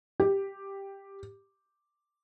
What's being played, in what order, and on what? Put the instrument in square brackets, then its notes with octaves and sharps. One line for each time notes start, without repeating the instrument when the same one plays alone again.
[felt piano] G4